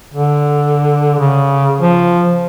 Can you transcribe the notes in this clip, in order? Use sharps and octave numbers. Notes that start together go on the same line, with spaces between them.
D3
C#3
F3